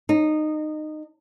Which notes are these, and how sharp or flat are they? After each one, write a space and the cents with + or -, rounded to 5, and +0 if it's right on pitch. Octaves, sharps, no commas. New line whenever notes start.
D#4 -20